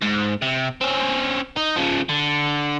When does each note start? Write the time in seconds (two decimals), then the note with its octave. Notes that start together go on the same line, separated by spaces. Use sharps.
0.02 G#2
0.42 C3
0.81 C4 C#4
1.57 D#4
1.76 C#3 F3
2.09 D3